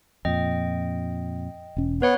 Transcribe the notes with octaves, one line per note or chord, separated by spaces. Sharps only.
F2 A#2 D#5 G5
E1 C#4
B3 B4 C#5 F#5